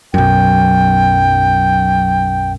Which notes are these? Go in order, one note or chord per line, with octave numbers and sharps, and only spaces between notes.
B1 F#2 G5